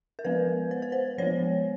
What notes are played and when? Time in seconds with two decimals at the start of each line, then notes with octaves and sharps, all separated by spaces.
0.19 A#4
0.25 F3 G#3 B3 B4
0.71 C5
0.82 B4
0.92 C5
1.18 F3 G#3 B3 C#5